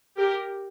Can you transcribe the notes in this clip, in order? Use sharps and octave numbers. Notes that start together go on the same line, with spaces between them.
G4 A#4